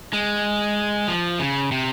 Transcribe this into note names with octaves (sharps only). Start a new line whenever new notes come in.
G#3
F3
C#3
C3